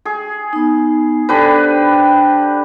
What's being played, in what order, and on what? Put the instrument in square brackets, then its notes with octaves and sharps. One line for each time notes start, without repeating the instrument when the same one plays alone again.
[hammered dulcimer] G#4
[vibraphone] B3 D#4
[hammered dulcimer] D3 G4 B4 [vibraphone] C5